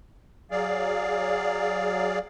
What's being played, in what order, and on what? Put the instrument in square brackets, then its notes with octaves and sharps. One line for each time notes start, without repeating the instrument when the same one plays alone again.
[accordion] F#3 G#4 D5 F5